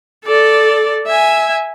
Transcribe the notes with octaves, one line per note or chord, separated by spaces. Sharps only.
A4 D5
E5 G#5